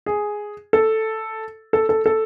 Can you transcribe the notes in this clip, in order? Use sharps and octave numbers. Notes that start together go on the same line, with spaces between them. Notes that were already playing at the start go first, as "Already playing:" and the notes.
G#4
A4
A4
A4
A4